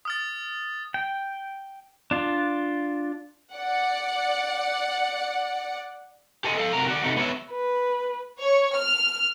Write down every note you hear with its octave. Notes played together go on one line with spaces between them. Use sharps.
D#6 F6 A6
G5
D4 F4
D5 F#5
G4 A4 C5 D#5 G#5
A4 F5
C3 F#4 A#4 A#5
F#4 D5
C3 A3 D#4
B3 C#5 D5 E5
B4
C#5
F6